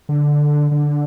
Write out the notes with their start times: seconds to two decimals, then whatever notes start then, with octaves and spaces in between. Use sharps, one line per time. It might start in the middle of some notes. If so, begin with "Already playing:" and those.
0.09 D3
0.71 D3